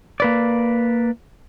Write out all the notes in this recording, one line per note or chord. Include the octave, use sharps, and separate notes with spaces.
A#3 B4 D5